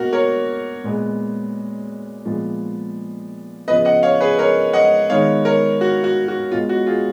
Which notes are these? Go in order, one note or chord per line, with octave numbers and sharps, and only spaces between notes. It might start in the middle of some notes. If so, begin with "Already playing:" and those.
Already playing: B2 A#3 F#4 A#4
A#4 C#5
A#2 G#3 B3
A#2 F3 G#3 B3
C#3 F3 B3 B4 D#5
D#5 F#5
C#5 F5
G#4 B4
A#4 C#5
D#5 F#5
D#3 G#3 B3 C#5 F5
A#4 C#5
F#4
F#4
F#4
B2 G#3 B3 F4
F#4
F4 G#4